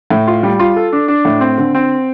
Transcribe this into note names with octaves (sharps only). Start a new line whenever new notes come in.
A2
F4
G3
F4
A4
D4
D4
A2
C4
D3
C4